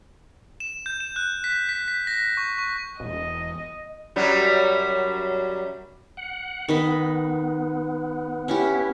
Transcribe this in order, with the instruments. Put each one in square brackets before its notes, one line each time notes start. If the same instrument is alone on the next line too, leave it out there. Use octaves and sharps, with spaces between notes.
[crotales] E7
G6
E7
F#6
B6
B6
B6
A#6
C#6
C#6
[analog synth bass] E1 [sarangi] D#5
[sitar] F#2 F#3 G3
[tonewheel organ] F#5
[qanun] D#3 D#5 B5 [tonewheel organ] B3
[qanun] C#4 E4 G4